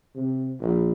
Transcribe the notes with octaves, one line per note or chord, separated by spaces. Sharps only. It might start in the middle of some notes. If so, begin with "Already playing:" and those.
C3
A#1